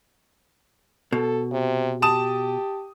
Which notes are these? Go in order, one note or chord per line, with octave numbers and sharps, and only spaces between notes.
B2 A4
C3
G4 A5 D#6 E7